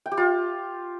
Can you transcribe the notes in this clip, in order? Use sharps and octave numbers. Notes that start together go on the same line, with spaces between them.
G5
G4
F4